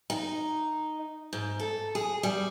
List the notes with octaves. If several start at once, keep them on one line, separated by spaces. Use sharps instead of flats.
D#4
G#2
A4
G#4
G3